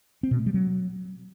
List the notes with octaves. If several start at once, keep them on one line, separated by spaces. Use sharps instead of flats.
C4
B2
A3
G3
F#3